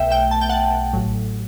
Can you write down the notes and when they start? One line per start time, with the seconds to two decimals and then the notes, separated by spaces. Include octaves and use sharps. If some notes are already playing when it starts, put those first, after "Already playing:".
Already playing: B1 B2 A3 E5 G5
0.10 E5 G5
0.31 A5
0.41 G5
0.49 F#5 A5
0.93 A1 A2 F#3